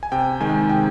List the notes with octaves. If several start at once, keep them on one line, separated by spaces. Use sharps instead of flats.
G#5
C3 G5
D#3 G#3 G#5
C3 G5